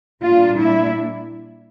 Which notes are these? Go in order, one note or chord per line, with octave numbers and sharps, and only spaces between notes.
A#2 G3 A#3 D4 F4
E4